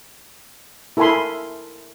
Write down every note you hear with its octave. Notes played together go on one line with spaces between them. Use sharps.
E4 A4 A#4 G#5 B5 C6